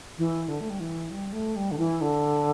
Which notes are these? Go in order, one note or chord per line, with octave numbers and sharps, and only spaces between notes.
E3
D3
A3
G3
E3
G3
A3
G3
D3
E3
D3